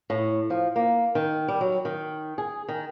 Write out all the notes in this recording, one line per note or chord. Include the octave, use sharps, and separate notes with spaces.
A2
F3
A#3
D#3
G3
F#3
D#3
G#4
D#3